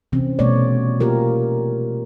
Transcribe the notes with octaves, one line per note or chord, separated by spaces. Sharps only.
C3 E3 C4 C#4
B2 G3 A3 B3 C#5 D5
A#3 F4 G4 A#4